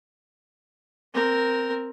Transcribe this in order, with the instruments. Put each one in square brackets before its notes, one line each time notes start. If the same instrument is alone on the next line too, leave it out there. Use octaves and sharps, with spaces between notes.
[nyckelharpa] C4 A#4